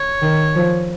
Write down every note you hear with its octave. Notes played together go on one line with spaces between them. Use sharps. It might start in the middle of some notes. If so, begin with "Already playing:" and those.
Already playing: C#5
D#3
F3